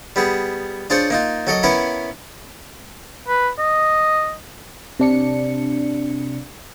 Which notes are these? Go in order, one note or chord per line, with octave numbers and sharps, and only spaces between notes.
G3 B3 G#4
D4 F4 G#4 C5 C#5
A#3 D#4 F4
F#3 A4 A#4 D#5
B3 C#4 E4 A#4 B4 F5
B4
D#5
C3 D4 C#7